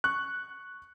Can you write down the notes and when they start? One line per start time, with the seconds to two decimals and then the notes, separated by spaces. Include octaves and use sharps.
0.04 C#6 F#6